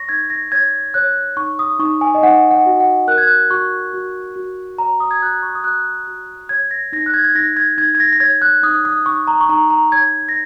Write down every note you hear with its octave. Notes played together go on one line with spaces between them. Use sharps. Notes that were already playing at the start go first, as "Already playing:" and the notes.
Already playing: C#5 C#6 A#6
D#4 G#6
A#6
C#5 G#6
C#5 F#6
D#4 C#6
D#6
D#4 C#6
G#5
D#5
D#4 F#5
F#5
F#4
F#5
A#4 F#6
G#6
F#6
F#4 C#6
F#4
F#4
C#5 A#5
D#6
G#6
F#4 F#6
C#6
D#6
F#4 F#6
F#4
C#5 G#6
A#6
D#4 A#6
F#6
G#6
G#6
D#4 A#6
G#6
D#4 G#6
G#6
A#6
A#6
C#5 G#6
F#6
D#4 D#6
D#6
D#4 C#6
A#5
C#6
D#4 A#5
A#5
C#5 G#6
A#6